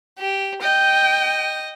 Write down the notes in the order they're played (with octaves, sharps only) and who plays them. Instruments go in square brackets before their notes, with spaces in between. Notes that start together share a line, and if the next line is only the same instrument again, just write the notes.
[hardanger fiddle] G4
[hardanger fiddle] D#5 [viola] G5